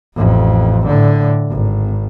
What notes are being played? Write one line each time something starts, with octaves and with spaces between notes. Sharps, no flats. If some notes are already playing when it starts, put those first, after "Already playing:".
A1 F2
A2 D3
G#1